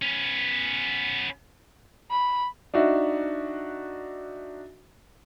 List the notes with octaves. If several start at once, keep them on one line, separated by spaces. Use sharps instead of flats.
B3 C#4
B5
D4 D#4 F#4 E5